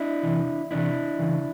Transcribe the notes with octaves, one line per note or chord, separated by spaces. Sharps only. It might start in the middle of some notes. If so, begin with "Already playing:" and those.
Already playing: D4 E4
E2 C3 E3
E2 C3 E3 D4 E4
E2 C#3 E3